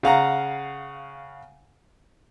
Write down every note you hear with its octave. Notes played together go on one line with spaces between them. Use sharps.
C#3 F5 F#5 A#5